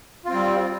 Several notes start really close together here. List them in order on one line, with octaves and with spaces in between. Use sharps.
F4 C4 G3